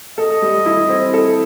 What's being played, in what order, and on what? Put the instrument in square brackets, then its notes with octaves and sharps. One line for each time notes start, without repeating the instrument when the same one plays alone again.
[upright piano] A4 [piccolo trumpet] D#5
[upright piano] G3
E4
C4
A4